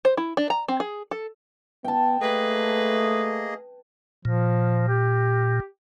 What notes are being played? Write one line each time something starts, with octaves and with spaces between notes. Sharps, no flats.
C5
E4
D4
A#5
C4
G#4
A4
B3 G5 A5
A3 A#3 G#4 B4 D#5
A#2 F3
G4